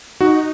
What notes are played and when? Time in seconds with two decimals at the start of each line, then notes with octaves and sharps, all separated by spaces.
0.21 D#4 F#4